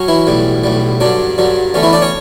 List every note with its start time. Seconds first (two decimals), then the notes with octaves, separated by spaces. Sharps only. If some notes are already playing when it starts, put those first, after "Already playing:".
Already playing: F#3 C#4
0.08 E3 E4
0.27 B1 A2 G3
0.64 B1 A2 G3
1.00 G2 D3 F#3 D4
1.38 G2 D3 F#3
1.74 E2 D3 A3 C#4
1.83 E3 E4
1.93 D4 D5
2.02 C#4 C#5